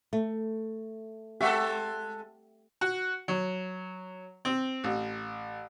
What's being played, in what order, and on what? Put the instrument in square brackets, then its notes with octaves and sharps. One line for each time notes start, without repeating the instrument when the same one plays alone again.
[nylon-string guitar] A3
[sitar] G#3 A4 [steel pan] G4 E5 F#5
[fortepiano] F#4
F#3
C4
A1